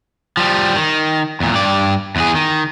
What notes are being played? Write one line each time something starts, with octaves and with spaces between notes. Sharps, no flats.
F3 G3
D#3
E2 A#2
G2 D5
E2 G#4
D#3